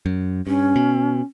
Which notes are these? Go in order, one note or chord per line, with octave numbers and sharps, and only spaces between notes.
F#2
G2 C#4
B2